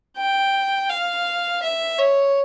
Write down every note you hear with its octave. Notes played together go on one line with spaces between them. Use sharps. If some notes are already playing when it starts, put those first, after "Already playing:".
G5
F5
E5
C#5